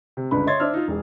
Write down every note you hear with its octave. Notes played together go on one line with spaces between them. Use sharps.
C3
C#2 G2 D3 B4 B5
C#5 D#5 E5 C6 G#6 A6
D4 C5 E5 E6 F6
D#4 F4
E1 G#4